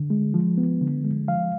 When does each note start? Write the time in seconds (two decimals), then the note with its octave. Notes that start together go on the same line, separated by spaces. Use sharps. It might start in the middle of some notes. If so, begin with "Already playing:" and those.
Already playing: D3
0.10 G#3
0.34 F3
0.58 B3
0.81 D3
1.05 G#3
1.28 F3 F5